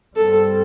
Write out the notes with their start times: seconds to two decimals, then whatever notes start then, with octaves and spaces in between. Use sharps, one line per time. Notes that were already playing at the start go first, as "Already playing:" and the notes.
0.16 G2 G3 C4 A4